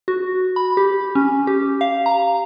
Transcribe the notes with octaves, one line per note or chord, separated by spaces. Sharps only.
F#4
B5
G4
C#4
G4
F5
A#5